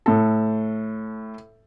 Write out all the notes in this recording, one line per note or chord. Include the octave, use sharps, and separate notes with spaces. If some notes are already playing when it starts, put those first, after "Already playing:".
A2 A4